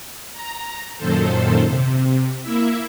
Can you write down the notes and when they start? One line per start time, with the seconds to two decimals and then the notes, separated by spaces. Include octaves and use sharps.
0.33 A#5
0.97 F#2 A#2 D#3 A4 C5
1.67 C3
2.42 A#3 E4 E5